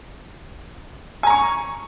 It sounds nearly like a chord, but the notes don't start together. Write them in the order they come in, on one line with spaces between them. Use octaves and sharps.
G#5 A#5 C#6